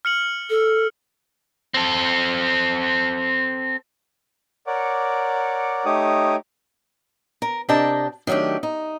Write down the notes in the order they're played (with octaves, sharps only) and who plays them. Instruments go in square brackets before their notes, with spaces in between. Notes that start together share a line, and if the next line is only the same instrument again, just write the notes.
[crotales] F6 C#7 F#7
[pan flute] A4
[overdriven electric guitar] C4 A4
[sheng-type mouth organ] A#4 C#5 D5 F#5 D6
A3 D#4 G4 C#5 D6 D#6
[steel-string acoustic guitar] A#4
C3 D4 A#4 D#5 G5 A5
D#3 F#3 A3 D4 G4
D#4